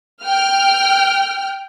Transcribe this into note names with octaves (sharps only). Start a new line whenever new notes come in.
G5 F6